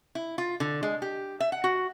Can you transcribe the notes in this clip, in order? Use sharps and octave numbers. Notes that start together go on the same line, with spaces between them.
E4
F4
D3
G#3
G4
E5
F#5
F#4